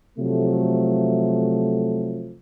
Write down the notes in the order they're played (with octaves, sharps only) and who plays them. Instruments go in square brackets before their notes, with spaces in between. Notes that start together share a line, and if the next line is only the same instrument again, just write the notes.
[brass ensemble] C3 F3 F#3 A3